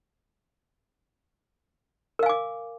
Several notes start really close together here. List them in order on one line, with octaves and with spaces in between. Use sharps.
A#4 F5 G#5 D6